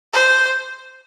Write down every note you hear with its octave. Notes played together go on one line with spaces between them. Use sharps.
C5